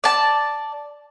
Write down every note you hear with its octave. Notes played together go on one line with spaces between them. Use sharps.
D5 A5